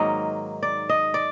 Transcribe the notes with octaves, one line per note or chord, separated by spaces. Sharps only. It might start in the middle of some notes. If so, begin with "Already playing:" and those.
Already playing: G#2 D#3 F#3 A#3 D#5
D5
D#5
D5